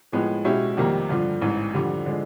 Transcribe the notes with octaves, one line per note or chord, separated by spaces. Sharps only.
A2 F3 G#3 B3
B2 G#3 C#4 E4 G4
F2 C3 D#3 G3 A#3
G2 D3 F3
A1 G#2 E3
F2 D3 G3
D3 F3 G#3